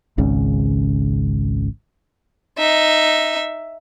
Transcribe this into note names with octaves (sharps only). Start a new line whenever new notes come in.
G#1 C#2 C#3
D#4 E5